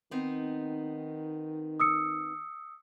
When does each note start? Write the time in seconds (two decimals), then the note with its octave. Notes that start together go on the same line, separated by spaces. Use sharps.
0.11 D#3 B3 C4 D#4
1.80 D#6 E6 C#7